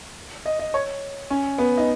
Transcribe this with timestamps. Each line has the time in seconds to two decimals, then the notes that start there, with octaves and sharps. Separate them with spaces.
0.46 D#5
0.59 D#5
0.74 C#5
1.30 C#4
1.58 B3
1.77 D#4